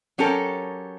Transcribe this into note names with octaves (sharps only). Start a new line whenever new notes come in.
F#3 C#4 G4 A4 A#4